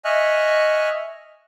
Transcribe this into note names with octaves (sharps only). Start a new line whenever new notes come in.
D#5 E5 G#5 C#6 F6 F#6